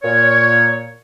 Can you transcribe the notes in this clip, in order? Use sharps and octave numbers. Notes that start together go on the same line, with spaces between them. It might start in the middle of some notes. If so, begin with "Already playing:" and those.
A#2 C#5